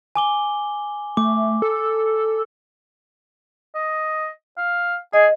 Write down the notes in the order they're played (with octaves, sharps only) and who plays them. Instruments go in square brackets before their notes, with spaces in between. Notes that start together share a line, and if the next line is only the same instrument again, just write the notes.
[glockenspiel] G#5 D6 G7
[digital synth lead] A3 [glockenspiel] D6
[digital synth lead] A4
[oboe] D#5
F5
[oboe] G#4 [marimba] D#5